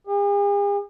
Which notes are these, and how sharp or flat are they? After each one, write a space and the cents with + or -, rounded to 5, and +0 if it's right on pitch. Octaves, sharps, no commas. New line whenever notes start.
G#4 -45